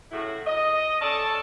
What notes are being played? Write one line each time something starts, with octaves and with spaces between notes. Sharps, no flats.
A2 C#3 A3 E4 F#4
D#5
C#4 A4 D5 A5